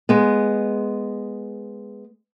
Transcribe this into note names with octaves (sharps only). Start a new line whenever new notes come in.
G#3 B3